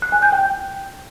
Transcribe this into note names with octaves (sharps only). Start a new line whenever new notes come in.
F#6
G#5
G6
G5